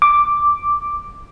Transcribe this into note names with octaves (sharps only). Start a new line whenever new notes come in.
D6